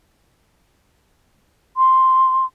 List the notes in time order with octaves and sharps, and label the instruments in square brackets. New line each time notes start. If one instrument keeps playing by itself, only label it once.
[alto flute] C6